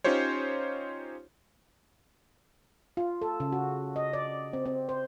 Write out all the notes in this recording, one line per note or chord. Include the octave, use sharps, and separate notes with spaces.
C#4 D#4 F4 G4 C5 C#5
F4
A4
C#3
F#4
D#5
D5
C4
C4
C5